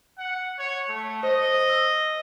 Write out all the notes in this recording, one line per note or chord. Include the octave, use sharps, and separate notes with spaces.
F#5
C#5
A3
C5 D#5
E6